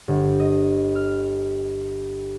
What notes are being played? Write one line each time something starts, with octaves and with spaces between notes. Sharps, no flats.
G1
D#5
F6